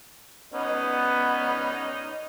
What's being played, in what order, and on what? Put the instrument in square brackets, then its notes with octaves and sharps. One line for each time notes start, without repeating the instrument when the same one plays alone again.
[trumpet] B3 [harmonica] C#4 D#4